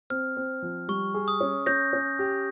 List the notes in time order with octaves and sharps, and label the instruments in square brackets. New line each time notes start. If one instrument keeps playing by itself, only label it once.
[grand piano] C4 [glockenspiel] F6
[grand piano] C4
F3
[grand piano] G3 [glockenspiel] C#6
[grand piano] G#4
[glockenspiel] D#6
[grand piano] C#4
[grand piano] C#4 [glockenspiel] G6 A#6
[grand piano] C#4
G4